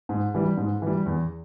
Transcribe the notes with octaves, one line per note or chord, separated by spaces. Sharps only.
G#2
E3 G3
G#2
E3 G3
E2